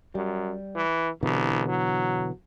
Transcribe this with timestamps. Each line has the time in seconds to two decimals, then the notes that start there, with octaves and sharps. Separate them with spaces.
0.15 F#2 G3
0.76 E3
1.23 C2 B2 D3 E3
1.69 F#3